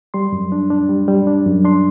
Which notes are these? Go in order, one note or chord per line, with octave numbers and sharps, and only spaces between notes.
G3 C6
F#2
D4
D4
G3
G3
D4
F#2
D4 C6